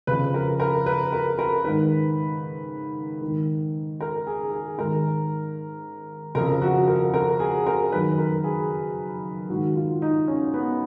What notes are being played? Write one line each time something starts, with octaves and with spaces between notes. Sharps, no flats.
F2 C#3 B4
A#4
A#4
B4
A#4
A#4
G#2 D#3 B4
G#2 D#3
A#4
G#4
G#4
G#2 D#3 A#4
F2 C#3 A#4
F#4
A#4
A#4
G#4
A#4
F#2 D#3 B4
A#4
G#4
G#2 D#3 F#4
F4
D#4
C#4
B3